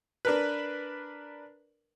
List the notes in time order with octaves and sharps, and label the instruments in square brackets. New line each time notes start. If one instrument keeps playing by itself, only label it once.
[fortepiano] D4 A#4 B4